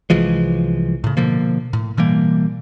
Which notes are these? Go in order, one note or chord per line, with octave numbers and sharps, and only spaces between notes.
C2 E3 F3 G#3
A2 C#3
B2 D3 F3 A#3
A2
B2 E3 G3 A#3